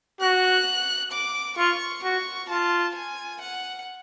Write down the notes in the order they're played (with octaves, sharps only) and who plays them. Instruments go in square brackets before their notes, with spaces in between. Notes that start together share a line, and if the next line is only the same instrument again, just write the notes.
[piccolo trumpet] F#4 [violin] F#6
[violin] D6
[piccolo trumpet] F4 [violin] C#6
[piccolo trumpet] F#4 [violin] C#6
[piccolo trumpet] F4 [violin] A5
[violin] G#5
F#5